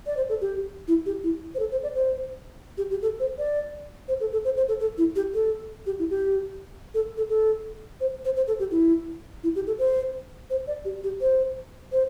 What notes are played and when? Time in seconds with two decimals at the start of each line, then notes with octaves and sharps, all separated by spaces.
0.06 D5
0.17 C5
0.29 A4
0.41 G4
0.88 E4
1.06 G4
1.24 E4
1.55 C5
1.59 A4
1.71 C5
1.83 D5
1.95 C5
2.78 G4
2.91 G4
3.02 A4
3.20 C5
3.38 D5
4.08 C5
4.20 A4
4.33 A4
4.45 C5
4.57 C5
4.68 A4
4.80 A4
4.98 E4
5.16 G4
5.34 A4
5.86 G4
5.99 E4
6.10 G4
6.94 A4
7.17 A4
7.29 A4
8.01 C5
8.25 C5
8.36 C5
8.48 A4
8.59 G4
8.71 E4
9.44 E4
9.55 G4
9.67 A4
9.79 C5
10.50 C5
10.67 D5
10.85 G4
11.04 G4
11.21 C5
11.92 C5